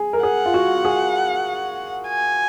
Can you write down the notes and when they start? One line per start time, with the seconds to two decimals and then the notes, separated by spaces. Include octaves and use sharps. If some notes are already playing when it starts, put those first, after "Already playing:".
Already playing: G#4
0.13 A#4
0.23 G#4 F#5
0.46 F4
0.54 F#4
0.85 G#4
2.08 G#5